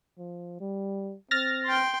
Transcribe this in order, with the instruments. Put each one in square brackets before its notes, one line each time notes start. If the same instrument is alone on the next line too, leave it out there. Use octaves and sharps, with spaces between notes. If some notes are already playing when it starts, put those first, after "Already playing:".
[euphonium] F3
G3
[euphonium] C4 [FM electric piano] F6 A6 A#6
[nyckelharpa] G5 C6